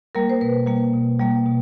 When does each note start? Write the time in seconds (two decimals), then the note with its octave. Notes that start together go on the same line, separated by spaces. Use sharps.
0.15 G3 A#3 A#4
0.30 C5
0.41 B2 B4
0.67 G3 A#3
0.93 B2
1.20 G3 A#3
1.46 B2